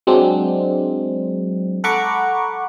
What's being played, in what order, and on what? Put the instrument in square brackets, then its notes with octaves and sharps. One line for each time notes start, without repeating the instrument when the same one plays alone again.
[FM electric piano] F#3 G#3 C4 D4
A4 F#5 A#5 B5 C#6 D6